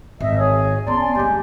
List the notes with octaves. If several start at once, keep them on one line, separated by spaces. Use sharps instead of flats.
G#1 D#5 E5
G#4 C#5
B3 C#4 D5 A5 A#5 C6
G#5
G2 C#3 G#3 A#3 G4